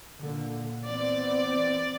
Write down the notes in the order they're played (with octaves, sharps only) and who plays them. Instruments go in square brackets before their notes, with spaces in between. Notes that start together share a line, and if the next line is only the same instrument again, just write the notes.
[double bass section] A#2 D3 A#3
[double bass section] E3 B3 C4 [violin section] D5